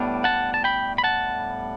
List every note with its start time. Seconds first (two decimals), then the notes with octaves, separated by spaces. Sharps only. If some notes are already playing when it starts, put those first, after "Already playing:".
Already playing: A2 G3 B3 D4
0.24 F#5 A5
0.54 A5
0.64 G5 B5
0.98 B5
1.04 F#5 A5